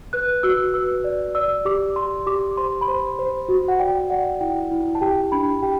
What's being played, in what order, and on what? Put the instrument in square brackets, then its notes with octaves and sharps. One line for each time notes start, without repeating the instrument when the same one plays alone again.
[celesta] B4 F#6
F#4 E6
B4 E6
D5
D5 E6
G4 D6
G4 C6
G4 D6
C5 C6
B5
C5 C6
C5
F#4
F#5
D5 G5
D5 F#5
E4 G5
E4
A5
G4 G5
D4 B5
G4 G5